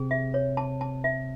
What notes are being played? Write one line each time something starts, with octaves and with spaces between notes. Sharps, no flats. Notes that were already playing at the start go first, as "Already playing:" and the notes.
Already playing: C3 C4 G#4
E5
C#5
A5
A5
E5